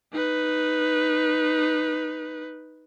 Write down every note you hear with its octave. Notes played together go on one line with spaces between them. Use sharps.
D#4 B4